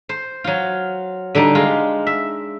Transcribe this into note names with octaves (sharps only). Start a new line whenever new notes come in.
C5
F#3 F4
D3 G3 D4 D#4
G#3 F4
E5